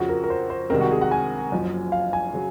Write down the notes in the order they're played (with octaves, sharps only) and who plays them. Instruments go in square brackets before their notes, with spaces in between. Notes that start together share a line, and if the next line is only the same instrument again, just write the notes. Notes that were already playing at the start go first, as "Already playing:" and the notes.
Already playing: [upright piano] F2 C#3 F3 [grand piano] F#4
[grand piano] A#4
A#4
C5
C5
[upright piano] C2 C3 D#3 G#3 C4 [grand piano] A#4
[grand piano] F#4
G#4
F#5
G#5
[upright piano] F#1 F#2 F3
[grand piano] F5
G#5
[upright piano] C#3 F#3